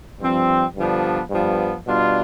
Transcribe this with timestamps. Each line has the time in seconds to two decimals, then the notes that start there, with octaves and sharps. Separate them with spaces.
0.20 G2 F3 C4
0.76 G2 D3 F3 B3 D4
1.31 G2 F3 B3
1.87 B2 G3 D4 F4